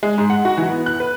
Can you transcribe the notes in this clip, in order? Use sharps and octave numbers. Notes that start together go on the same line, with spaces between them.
G#3
G#2
F#5
F#4
E3
B3
F#6
B4